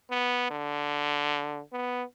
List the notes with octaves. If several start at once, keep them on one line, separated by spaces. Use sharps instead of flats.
B3
D3
B3